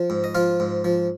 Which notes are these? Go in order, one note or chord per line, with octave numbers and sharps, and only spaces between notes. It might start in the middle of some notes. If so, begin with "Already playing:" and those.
Already playing: F3
G#2
D#5
F3 F4 F5
G#2
F3